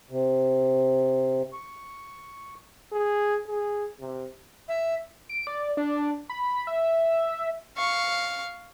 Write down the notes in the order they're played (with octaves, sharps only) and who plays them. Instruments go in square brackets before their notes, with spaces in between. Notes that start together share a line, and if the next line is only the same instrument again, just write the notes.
[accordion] C3
C#6
[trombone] G#4
G#4
C3
[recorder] E5
[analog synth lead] D7
D5
D4
B5
E5
[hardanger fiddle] F5 C#6